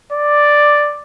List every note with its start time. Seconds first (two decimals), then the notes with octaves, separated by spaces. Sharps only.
0.12 D5